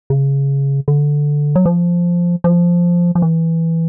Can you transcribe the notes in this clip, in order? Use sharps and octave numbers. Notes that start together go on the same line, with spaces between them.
C#3
D3
F#3
F3
F3
F3
E3